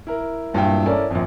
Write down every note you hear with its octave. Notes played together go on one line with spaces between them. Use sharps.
E4 A#4
E1 G2 A#2 E4 G5
C#4 E4 A4 A#4 D5
A#1 F2